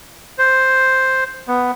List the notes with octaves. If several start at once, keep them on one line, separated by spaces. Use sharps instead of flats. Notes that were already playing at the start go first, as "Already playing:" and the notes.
C5
B3